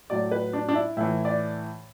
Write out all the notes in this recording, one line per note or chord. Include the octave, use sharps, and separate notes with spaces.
A2 F#3 D5
B4
D4
D4
E4
A2 E3 E4
D5